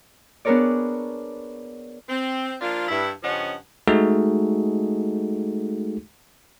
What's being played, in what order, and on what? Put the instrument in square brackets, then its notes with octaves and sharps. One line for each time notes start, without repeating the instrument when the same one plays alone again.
[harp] B3 D4 G#4 A#4 C#5 D5
[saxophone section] C4
F3 A#3 D4 F4
G2 E4
G2 C#3 F3 C#4 D#5 F#5
[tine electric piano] G#3 A3 D#4 F#4 G#4 A4